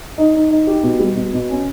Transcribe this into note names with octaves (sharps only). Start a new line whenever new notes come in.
D#4
D#4
D#4
G4
B2
G3
B2
B2
C#4